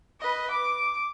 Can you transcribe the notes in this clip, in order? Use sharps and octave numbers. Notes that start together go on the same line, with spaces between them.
B4 D#5
D6